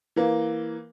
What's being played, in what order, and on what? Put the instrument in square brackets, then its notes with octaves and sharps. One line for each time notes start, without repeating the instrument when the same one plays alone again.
[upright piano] E3 A#3